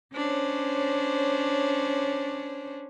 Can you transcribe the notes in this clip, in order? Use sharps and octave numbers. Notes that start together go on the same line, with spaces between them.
C#4 D4 C5 C#5